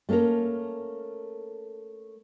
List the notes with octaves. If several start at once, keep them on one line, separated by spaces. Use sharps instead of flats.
A3 A#3 C#4 A4 A#4